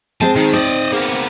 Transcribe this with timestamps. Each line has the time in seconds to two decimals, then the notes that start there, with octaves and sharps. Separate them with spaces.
0.21 G#3 C4 G#4 A5
0.36 D#3 D#4 G5
0.53 C4 D5 D#5
0.92 A#3 B3 G#4